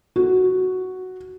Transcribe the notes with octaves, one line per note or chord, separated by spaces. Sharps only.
F#4